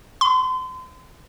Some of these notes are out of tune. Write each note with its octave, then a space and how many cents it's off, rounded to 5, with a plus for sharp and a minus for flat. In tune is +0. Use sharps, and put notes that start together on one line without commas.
C6 -35